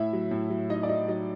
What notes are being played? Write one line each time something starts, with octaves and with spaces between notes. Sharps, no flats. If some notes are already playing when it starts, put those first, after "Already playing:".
Already playing: A2 E4 E5
F#3
A2
F#3
F#3 D#4 D#5
D5
F#3 D#4 D#5
F#3 D#4 D#5